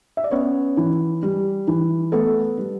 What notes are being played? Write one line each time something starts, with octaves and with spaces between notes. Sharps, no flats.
E5
D5
B3 C#4 C#5
E3
G3
E3
A3 B3 A4
G3